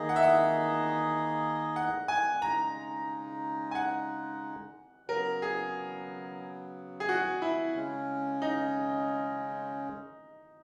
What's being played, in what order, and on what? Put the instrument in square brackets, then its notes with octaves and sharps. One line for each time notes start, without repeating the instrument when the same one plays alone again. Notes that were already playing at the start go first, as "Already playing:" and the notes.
Already playing: [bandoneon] D#3 A#3 D#4 G#4 D#5
[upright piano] F#5
E5
F#5
F#5
G#5
[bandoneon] C#3 G#3 D#4 [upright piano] A#5
[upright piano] G#5
F#5
[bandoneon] C#3 F#3 B3 [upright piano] A#4
[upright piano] G#4
G#4
F#4
E4
[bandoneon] C#3 G#3 C#4
[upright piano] D#4